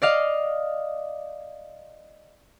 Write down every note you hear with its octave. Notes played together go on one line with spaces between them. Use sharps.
D5 D#5 F5